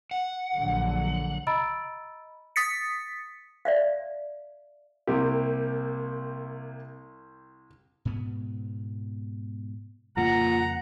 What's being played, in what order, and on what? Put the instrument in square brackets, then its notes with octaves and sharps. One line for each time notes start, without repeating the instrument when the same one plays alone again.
[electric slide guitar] F#5
[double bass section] A#1 D3 F#3
[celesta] D#5 A#5 B5 E6 A6 D7
[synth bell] D#6 A6 B6 C#7
[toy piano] D5 E5 F5
[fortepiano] C2 G4 [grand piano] C3 A#3
[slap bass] G#2 B2 B3
[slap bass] F2 C#3 G3 [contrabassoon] A#2 [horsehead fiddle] F#5 [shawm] A#5